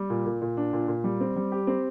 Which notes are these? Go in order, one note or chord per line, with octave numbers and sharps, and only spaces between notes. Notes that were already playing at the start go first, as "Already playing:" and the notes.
Already playing: G3
A#2
A#2
A#2
D4
A#2
A#2
G3
C4
G3
G4
C4